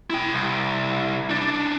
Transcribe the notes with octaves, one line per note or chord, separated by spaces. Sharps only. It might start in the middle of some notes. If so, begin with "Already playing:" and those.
E4 G5
C2
D4 D#4